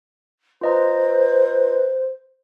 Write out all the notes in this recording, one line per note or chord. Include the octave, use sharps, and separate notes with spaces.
F4 B4 C5 D#5 A#5